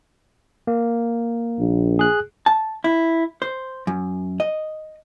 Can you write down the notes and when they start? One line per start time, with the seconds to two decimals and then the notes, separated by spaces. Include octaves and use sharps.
0.67 A#3
1.59 A#1
1.99 G#4 F#6
2.46 A5
2.84 E4
3.42 C5
3.87 F#2
4.40 D#5